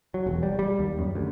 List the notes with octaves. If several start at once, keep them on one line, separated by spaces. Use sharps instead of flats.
F#3
E1
G3
G3
D#2
F#2
D2